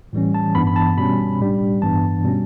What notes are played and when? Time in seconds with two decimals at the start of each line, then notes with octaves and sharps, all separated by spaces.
0.13 A2 E3 G3 C#4
0.35 A5
0.55 G2 E3 B3 D4 B5
0.67 B5
0.76 A5
0.97 B2 G3 C#4 B5
1.40 A2 G3 D4
1.82 G2 E3 B3 D4 A5
2.24 B2 G3 C#4